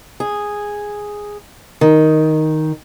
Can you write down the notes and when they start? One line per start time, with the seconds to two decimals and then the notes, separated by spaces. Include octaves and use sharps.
0.20 G#4
1.81 D#3